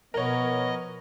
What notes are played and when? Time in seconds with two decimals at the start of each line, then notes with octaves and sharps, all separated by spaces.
0.14 B2 F3 B3 A#4 C#5 D#5